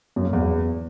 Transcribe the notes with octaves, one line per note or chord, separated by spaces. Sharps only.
F#2
A#3
E2